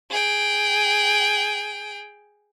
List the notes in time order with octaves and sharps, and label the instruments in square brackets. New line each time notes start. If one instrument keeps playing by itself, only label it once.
[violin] G#4 G5